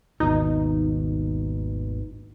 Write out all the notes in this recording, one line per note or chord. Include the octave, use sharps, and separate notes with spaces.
G#1 D#2 B2 D#4